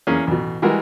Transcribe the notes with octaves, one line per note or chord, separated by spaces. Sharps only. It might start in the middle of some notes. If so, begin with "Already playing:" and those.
E2 A#3 C#4 G#4
A1 B2
E3 G3 G#3 F#4 A#4